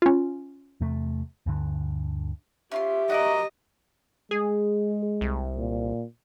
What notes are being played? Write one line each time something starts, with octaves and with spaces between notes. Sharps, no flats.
C#4 F4
E2 C3 A3
D2 G2 D3
C#4 F4 G4 E5 C6
F#4 A#4 D5 D#5
G#3 G#4
C2
A#2